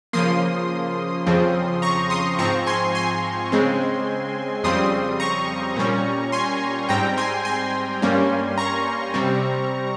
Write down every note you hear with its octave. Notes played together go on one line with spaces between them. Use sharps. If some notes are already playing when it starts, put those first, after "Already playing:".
C#3 F3 A#3 C6 D#6
F2 C#3 F3 C4
A#5 C#6
C6 D#6
G#2 F3 C4 A#5 C#6
G#5 C6
G#5 C6
C#3 G#3 C4
F2 C#3 G3 C4 C6 D#6
A#5 C#6
A#2 G3 C#4
G#5 C6
G#2 G3 C4 G5 A#5
G#5 C6
G#5 C6
G2 G3 A#3 C#4
A#5 C#6
C3 G3 C4